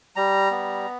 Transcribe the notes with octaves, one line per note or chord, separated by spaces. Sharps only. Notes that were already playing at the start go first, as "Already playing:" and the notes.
G3 A#5
B3